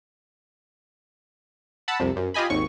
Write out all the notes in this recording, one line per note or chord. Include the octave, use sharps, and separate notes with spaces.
F#5 A5 B5 E6
C2 F2 C3
F#2
F4 G4 D#5 G#5 B5
G#1 D#2 C#6